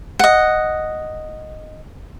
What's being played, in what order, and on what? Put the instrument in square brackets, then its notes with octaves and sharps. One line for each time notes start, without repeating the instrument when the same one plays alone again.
[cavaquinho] D#5 F#5